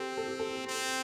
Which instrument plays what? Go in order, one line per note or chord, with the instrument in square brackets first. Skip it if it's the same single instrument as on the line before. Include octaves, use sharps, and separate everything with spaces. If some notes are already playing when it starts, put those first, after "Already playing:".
Already playing: [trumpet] C4 [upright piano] G4 A4
[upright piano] A4
G4
A4
[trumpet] C4